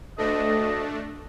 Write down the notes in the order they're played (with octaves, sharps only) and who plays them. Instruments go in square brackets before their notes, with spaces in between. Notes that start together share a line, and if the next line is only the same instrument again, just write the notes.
[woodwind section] D2 D#5 [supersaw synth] A3 D4